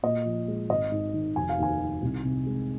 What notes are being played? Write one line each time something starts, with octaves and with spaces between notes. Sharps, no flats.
A#2 D#5
F3
G#3
G#1 D#5
G#2
D#3
F1 G#5
F5
D#2 G#5
D#3
C2
C3
G#3